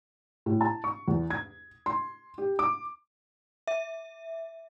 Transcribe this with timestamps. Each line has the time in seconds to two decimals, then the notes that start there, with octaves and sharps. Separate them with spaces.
0.46 A2
0.61 A5
0.84 C#6
1.08 E2
1.30 G#6
1.86 C6
2.38 G4
2.59 D6
3.67 E5